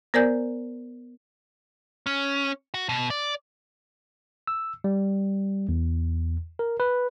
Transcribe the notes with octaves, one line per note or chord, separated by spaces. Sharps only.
B3 A#4 C5 D5 G#5 G6
C#4
F#4
B2
D5
E6
G3
E2
A#4
B4